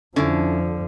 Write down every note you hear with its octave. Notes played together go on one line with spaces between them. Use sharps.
F2 D3 F3 C#4 E4